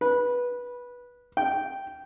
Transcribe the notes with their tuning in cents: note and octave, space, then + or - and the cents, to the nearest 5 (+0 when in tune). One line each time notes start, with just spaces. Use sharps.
B4 -15
G5 -10